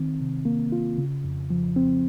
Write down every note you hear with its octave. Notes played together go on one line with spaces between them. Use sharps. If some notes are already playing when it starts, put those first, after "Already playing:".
Already playing: D#3 C4
C3
A#3
F4
C#3
F2
F3
C4